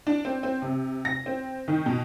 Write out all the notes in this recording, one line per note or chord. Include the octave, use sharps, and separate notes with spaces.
D4
C4
C4
C3
A#6
C4
D#3
B2